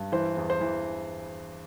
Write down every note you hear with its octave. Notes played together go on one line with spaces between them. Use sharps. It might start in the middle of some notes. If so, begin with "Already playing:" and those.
Already playing: G2
E3 C5
E2
C5
E3